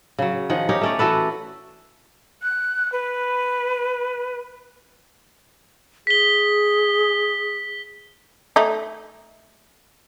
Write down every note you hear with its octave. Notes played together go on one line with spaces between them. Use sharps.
C#3 F#3
D#3 F3 G#4 F#5
C#4 D#4 G4 C#5
A3 C#4 D5
E3 F#4 A4 B4
F#6
B4
G#4 B6 G7
A3 D#4